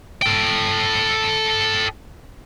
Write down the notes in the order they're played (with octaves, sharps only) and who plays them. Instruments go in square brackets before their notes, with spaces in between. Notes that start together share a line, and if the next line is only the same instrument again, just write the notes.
[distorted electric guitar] A4 G5